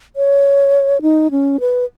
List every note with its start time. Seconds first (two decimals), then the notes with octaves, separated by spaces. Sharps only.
0.16 C#5
1.02 D#4
1.31 C#4
1.60 B4